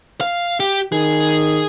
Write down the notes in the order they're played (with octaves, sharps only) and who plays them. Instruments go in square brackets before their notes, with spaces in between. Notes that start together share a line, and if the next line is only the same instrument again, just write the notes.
[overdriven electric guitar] F5
G4
[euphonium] D#3 [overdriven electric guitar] G#4